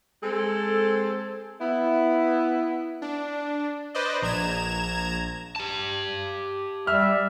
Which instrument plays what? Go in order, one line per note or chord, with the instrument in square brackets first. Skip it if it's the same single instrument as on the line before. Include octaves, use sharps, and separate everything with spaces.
[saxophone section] G#3 C4 A4
B3 E4
[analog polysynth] D4
B4 C5 D5 D#5
A#1 A#5 G#6 E7
[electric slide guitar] G4 A5
[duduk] G3 [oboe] E5 [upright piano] F6